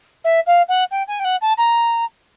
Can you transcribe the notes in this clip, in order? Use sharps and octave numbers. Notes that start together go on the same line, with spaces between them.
E5
F5
F#5
G5
G#5
G5
F#5
A5
A#5